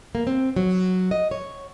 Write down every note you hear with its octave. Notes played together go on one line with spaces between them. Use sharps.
A#3
C4
F#3
D#5
C#5